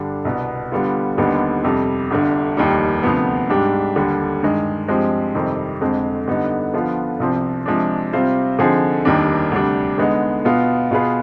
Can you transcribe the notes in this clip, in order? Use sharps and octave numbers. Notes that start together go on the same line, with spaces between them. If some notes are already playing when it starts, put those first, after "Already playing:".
Already playing: G2 D3 G3 D4
C2 B2 B3
D3 G3 B3 F4
D#2 D3 G3 B3 D#4
F2 C3 G3
G1 G2 D3
F1 D#2 D#3 G3
D2 C3 F3 B3
G#2 G3 D4 G4
D#2 D3 G3
G2 D#3 G#3
G2 F3 G#3 C4 G4
F2 C3 D#3 G3 C4
F2 D3 G#3 C4
G2 D3 G3 B3 D#4
D3 F3 B3 F4
C2 C3 F3 C4
C3 F3 G#3 D4
C3 G3 C4 F4 C5
D3 F3 C4 D#4 G#4
F1 D#2 D#3 G3 D4
D2 C3 G3 D4
D3 G#3 B3 D#4
B2 B3 F4
B2 B3 F4 G#4 B4